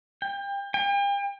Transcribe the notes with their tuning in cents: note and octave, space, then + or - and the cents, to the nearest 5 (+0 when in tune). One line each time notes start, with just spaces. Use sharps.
G5 +30
G5 +40